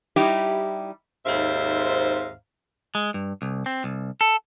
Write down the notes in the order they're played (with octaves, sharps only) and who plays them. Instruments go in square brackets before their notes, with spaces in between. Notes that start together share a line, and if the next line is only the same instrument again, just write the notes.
[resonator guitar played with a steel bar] G3 D#4 E4 G4
[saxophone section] D#2 G#2 C4 C5 E5 F5
[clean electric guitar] G#3
G2
C2
C4
C2
A4